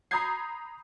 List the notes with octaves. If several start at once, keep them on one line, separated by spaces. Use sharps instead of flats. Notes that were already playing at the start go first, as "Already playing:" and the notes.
A#5 B5 D#6 G6 G#6 C7